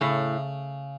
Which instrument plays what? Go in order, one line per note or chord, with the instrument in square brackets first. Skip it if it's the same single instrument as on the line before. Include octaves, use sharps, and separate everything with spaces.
[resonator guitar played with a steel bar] A2 [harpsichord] C#3